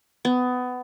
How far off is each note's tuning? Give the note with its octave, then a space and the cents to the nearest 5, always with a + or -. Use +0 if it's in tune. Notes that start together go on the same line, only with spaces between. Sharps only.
B3 +20